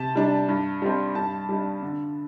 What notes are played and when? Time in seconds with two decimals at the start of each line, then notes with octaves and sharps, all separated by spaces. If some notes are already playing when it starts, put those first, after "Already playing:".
Already playing: C3 A5
0.15 G3 D4
0.48 G2
0.82 G3 C4
1.15 G2 A5
1.49 G3 D4
1.82 D3